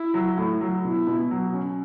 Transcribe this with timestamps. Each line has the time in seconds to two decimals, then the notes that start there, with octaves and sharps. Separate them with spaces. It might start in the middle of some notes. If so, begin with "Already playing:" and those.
Already playing: E4
0.14 F#3
0.38 A2
0.61 F#3
0.85 B2 E4
1.07 B2
1.31 F#3
1.53 C#4